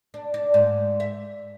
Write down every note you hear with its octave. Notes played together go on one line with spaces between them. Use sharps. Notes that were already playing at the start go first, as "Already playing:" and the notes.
D4
D4
G#2
E5